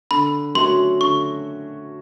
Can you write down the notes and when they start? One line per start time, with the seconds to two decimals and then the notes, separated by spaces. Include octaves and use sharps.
0.11 D3 B5
0.55 F#3 A3 C#4 F#4 C6
1.00 D3 C#6